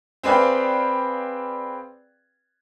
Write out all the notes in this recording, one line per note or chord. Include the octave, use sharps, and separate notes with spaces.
C4 G#4 B4 D5 F5 G5